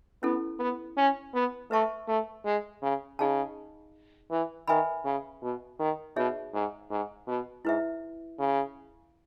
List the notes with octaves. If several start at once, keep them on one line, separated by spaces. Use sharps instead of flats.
B3 C#4 E4 A4
B3
C#4
B3
A3 B4 E5 A5 C#6
A3
G#3
C#3
C#3 D#4 G#4 D#5 A5
E3
D#3 B4 E5 G#5 B5
C#3
B2
D#3
B2 D#4 G#4 C#5 E5
G#2
G#2
B2
G#2 E4 B4 E5
C#3